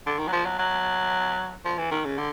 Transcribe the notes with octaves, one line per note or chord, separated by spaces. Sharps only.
D3
D#3
F#3
F3
F#3
F#3
F3
E3
D#3
C#3
D3